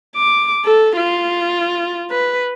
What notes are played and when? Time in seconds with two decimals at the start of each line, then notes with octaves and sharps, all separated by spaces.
0.16 D6
0.64 A4
0.97 F4
2.11 B4